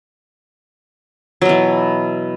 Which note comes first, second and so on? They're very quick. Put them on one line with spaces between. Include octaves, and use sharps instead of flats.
F#3 B2 E3